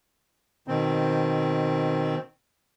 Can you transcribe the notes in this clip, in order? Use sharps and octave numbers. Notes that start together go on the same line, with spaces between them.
B2 D#3 C4